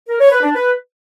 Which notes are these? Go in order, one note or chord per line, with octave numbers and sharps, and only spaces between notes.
A#4
C#5
B4
D4
B4